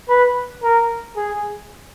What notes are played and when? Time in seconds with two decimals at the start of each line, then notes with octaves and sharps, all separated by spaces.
0.09 B4
0.62 A#4
1.16 G#4